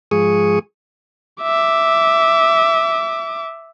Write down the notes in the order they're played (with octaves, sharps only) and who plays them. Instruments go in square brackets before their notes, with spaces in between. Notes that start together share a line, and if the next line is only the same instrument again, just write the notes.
[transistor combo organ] G#2 F3 G#3 G#4 C#6 D#6
[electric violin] E5 D6